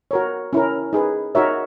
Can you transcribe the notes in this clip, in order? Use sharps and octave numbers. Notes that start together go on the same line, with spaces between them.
F#4 A#4 C#5
C#4 E4 A#4
D#4 G#4 B4
D#4 F#4 A#4 C#5 E5